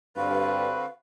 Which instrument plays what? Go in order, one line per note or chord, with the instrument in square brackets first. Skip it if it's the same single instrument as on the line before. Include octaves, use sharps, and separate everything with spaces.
[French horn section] G2 [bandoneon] D3 C4 F#4 [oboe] B4 [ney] F5